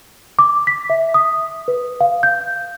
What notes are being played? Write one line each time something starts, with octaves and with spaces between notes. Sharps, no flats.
D6
B6
E5
D#6
B4
F5
G6